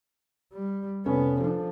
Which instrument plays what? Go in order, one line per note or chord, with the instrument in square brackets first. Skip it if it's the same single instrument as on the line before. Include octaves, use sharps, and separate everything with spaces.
[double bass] G3
[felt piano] F1 C#4 A4 [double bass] B3
[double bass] F3 [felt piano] D4 A4